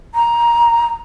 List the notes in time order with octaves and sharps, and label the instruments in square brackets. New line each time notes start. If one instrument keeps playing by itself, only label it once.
[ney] A#5